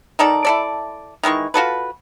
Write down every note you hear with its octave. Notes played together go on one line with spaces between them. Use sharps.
D#3 D#4 A4 D5
E4 A4 D5
D#3 E3 G#3 C#6
F4 F#4 A4 B4